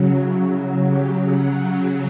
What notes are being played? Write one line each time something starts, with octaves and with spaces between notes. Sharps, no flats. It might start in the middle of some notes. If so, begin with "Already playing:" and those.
Already playing: C#3 F#3
E4
F#4
G4
F#4